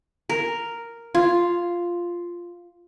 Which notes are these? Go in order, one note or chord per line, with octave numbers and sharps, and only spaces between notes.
A#4
F4